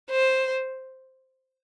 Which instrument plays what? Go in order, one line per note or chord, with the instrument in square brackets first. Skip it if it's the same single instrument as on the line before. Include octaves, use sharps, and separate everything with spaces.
[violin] C5